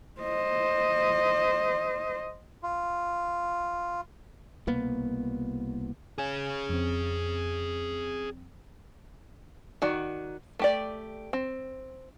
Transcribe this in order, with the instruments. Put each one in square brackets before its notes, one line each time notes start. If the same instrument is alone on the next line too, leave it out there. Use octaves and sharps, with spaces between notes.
[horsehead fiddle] C5 D#5
[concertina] F4
[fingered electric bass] C2 B2 A#3 B3
[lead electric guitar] G#4 C#5 [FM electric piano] G#5
[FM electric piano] F2 C4
[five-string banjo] D#3 F#4 D5
A3 G4 D5
C4